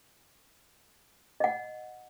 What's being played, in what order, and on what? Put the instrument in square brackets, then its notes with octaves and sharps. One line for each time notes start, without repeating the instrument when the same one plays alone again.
[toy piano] D#5 F#5